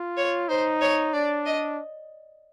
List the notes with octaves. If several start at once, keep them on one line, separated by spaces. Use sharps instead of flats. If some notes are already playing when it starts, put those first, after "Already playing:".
Already playing: F4
C#5
D#4 C5
C#5
D4 D5
D#5